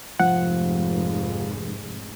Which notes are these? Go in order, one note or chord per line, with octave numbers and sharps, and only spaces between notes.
F1 G#2 F3 F#5